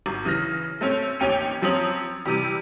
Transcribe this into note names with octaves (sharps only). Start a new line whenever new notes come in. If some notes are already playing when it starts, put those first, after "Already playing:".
G#1
C#3 E3 F6 A#6
A3 C4 C#4
A1 D#2 C#4 G5 C#7 D#7
F#2 F3 C4 C#4 D#6 F#7
C3 E3 G3